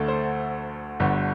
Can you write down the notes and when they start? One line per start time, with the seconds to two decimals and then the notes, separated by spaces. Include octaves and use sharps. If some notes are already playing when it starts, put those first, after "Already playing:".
Already playing: D2 D3 A3 A4
0.08 C5
1.00 G1 G2 D3